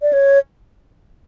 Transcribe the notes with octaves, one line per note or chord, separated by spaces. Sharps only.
D5
C#5